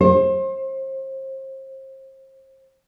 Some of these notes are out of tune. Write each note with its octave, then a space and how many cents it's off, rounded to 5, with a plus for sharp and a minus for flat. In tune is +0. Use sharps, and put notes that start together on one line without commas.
C5 +35